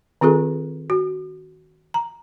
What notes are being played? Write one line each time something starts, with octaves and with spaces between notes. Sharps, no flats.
D#3 C4 F4 G#4 A4
F#4
A#5